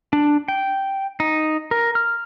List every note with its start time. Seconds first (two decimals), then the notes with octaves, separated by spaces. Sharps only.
0.13 D4
0.48 G5
1.20 D#4
1.71 A#4
1.95 F6